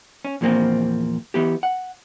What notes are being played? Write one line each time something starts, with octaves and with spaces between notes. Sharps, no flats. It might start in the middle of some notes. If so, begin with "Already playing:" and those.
C#4
E2 A#2 F3 A#3 C4
E3 B3 G4
F#5